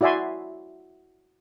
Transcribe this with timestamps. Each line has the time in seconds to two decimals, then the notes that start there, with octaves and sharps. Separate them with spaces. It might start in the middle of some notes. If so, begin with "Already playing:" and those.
0.01 E4 F#4 D5 E5 G#5 C6